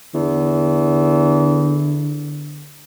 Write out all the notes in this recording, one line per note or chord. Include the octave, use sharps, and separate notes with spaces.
E2 D3